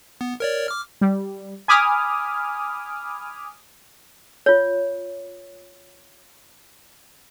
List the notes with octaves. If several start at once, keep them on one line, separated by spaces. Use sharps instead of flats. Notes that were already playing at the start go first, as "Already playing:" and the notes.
B3
A#4 C#5 D5
D6 F6
G3
G#5 B5 D6 D#6 F6
F4 C#5